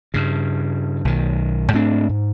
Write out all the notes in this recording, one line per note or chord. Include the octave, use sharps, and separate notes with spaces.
G2 C#3
B1 D#3
G#2 A3 C4 D4
G#2